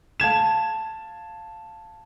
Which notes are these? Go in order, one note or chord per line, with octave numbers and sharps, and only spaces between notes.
F5 A5 G#6 E7